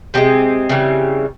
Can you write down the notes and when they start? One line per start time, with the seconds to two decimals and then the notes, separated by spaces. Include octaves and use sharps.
0.14 C3 F3 G#3 C4
0.69 C#3 E3 G3